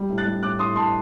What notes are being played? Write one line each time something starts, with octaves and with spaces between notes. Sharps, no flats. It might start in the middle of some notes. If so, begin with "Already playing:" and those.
Already playing: G3
A2
F#6 A6
G3
A2 D6 F#6
A2 C6 D#6
A2 A5 C6